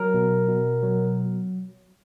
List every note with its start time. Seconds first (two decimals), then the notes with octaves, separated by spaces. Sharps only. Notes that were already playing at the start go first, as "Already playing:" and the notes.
Already playing: F#3 A#4
0.14 B2
0.48 B2
0.83 F#3